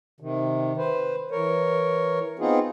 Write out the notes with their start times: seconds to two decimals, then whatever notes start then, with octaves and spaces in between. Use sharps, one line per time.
0.20 C3 D#3
0.77 B4 C5
1.31 E3 A#4 C#5
2.39 B3 C4 D#4 F4 G#4